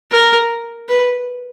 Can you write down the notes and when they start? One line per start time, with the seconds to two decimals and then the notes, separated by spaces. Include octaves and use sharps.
0.11 A#4
0.89 B4